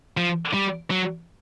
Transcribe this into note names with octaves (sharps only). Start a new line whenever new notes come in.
F3
G3
F#3